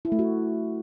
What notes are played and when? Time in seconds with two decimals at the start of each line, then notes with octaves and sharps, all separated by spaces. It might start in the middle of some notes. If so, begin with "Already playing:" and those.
0.05 E4
0.12 A3
0.19 F#4